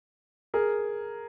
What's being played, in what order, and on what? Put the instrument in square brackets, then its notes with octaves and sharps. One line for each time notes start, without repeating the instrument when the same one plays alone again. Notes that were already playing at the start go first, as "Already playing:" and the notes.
[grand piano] G#4 A#4